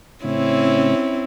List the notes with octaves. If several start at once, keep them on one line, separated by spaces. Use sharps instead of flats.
A2 C#3 C4 C#4 E4